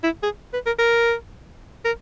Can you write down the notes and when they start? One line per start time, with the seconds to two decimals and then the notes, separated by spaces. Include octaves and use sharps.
0.04 E4
0.23 G#4
0.53 B4
0.66 A#4
0.79 A#4
1.85 A#4